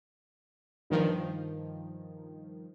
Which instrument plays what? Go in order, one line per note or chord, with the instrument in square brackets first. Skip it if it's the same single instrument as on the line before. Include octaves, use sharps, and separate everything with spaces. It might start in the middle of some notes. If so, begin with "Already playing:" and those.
[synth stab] G2 D#3 F3